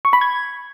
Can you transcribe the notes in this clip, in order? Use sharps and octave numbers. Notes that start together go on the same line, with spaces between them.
C#6
B5
G#6